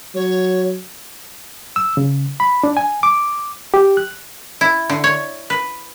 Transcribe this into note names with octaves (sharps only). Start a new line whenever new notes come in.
F#3 C#5
E6
C#3
B5
D4
G#5
D6
G4
F#6
E4
D3
C#5
B4